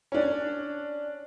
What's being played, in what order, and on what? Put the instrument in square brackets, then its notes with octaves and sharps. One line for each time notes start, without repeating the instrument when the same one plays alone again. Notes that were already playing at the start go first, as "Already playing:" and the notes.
[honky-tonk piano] C#4 D4